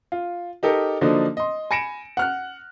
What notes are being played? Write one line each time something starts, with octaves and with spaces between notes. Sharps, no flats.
F4
D#4 G4 A4 A#4
D3 F3 F#3 A#3 D4 D#4
D#5 C6
G#5 B5 A#6 C#7 D7 E7
F#5 F6 F#6